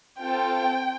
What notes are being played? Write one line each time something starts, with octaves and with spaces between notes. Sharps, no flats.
C4 F4 A4 G5